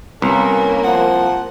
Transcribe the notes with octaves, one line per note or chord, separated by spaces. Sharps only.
C2 A#3 B3 C#4
F3 F#5